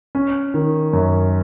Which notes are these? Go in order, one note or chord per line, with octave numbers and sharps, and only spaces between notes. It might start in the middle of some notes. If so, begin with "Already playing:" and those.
C#4
D#3
F#2